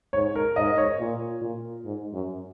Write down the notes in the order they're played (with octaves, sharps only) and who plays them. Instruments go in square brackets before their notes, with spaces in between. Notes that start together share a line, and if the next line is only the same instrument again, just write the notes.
[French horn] G#2 [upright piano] C#5
[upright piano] A#4
[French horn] G#2 [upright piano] D#5
[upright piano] C#5
[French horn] A#2
A#2
G#2
F#2